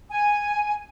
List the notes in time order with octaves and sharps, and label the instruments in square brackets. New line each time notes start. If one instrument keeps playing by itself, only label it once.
[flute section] G#5